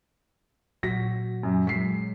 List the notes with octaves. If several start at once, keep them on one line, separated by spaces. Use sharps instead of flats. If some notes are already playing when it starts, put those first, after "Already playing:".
A#2 F#3 F#4 A#6 B6
F#2
F#3 G#3 B6 C7